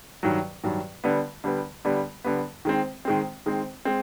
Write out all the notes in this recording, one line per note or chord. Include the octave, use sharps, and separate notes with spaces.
G2 D#3 F#3
G2 D#3 F#3
D3 G3 B3
D3 G3 B3
D3 G3 B3
D3 G3 B3
D#3 G#3 C4
D#3 G#3 C4
D#3 G#3 C4
G#3 C4